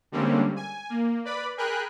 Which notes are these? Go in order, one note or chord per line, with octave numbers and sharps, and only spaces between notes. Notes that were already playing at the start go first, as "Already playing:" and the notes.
D3 G3 G#3 A#3 C4 C#4
G#5
A#3
B4 D5 B5
G#4 A#4 G5 G#5 B5 F#6